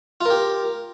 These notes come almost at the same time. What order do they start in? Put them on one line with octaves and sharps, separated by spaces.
F4 A#4 G4